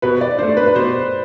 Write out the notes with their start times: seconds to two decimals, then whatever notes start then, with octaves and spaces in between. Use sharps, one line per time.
0.02 B2 B4
0.21 D5
0.39 A3 D4 C5
0.57 B4
0.67 B4
0.75 B2 C5